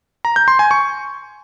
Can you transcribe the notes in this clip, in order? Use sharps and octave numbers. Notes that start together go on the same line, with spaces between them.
A#5
G6
C6
G#5
C#6